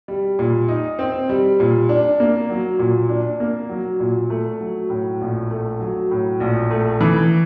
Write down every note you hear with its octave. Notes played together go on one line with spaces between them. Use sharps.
G3
A#2
D#4
C4
G3
A#2
D4
A#3
F#3
A#2
D4
A#3
F#3
A#2
A3
F#3
A2
A#1
A3
F#3
A2
A#1
A3
E3